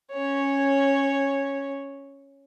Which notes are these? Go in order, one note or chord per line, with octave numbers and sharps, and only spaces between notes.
C#4 C#5